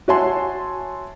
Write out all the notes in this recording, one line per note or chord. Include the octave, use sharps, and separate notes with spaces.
F#4 C#5 E5 G#5 A5 C6